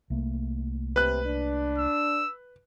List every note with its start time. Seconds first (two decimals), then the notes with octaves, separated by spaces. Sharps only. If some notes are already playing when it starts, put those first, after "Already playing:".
0.10 C2 A3 A#3
0.96 C3 B4 F#6
1.26 D4
1.78 E6